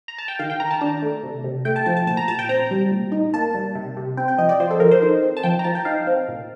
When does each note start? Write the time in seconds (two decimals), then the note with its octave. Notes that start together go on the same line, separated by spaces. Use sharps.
0.08 A#5
0.18 A5
0.28 G5
0.39 D#3 F5
0.50 G5
0.60 D#3 A#5
0.71 A5
0.81 D4 A#5
1.02 A3
1.23 C3
1.44 C3
1.65 A3 G5
1.76 A5
1.86 F3 A5
1.97 A5
2.07 A#2 A5
2.17 A#5
2.28 A#2 A5
2.39 G5
2.49 C4 A#5
2.71 G3
2.91 A#2
3.12 D#4
3.34 A#3 A5
3.55 G3
3.75 C3
3.97 C3
4.17 C4 G5
4.28 G5
4.38 F3 D#5
4.49 D5
4.60 F3 C5
4.71 A4
4.80 F3 A#4
4.91 C5
5.02 D#4
5.23 C4
5.37 A5
5.43 F3 G5
5.59 A#5
5.64 F3 A5
5.75 G5
5.85 D#4 F5
6.07 C4
6.28 A#2